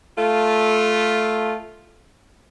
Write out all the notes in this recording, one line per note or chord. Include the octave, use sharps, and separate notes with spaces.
A3 F4